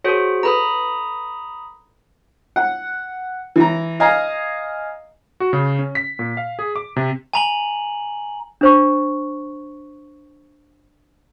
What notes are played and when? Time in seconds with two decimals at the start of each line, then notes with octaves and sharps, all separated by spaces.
0.04 F#4 G#4 A#4 C5 C#5
0.43 E4 A4 B4 A#5 B5 D#6
2.56 F#5
3.56 E3 A#5
4.00 D#5 F5 G#5 A#5
5.40 F#4
5.53 C#3
5.79 C#4
5.95 B6
6.19 A#2
6.37 F5
6.59 G#4
6.76 D6
6.96 C3
7.33 G#5 A#5 F#7
8.61 D4 C5 C#6